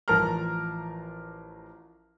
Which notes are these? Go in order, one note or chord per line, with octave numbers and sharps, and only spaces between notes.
A1 F3 A#4 A5 A#5 F6